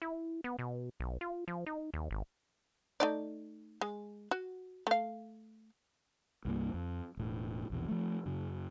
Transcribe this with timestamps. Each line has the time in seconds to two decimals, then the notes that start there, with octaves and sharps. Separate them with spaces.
0.02 E4
0.44 B3
0.59 B2
1.00 B1
1.21 F4
1.48 F3
1.66 D#4
1.94 D#2
2.11 G#1
3.00 A3 D#4 D5
3.81 G#3
4.31 F#4
4.87 A3 F5
6.45 C2 G2 A#3
6.74 F2
7.17 E1 A2
7.70 A#1 E2 B2
7.89 F3 A3
8.26 F#2 C#3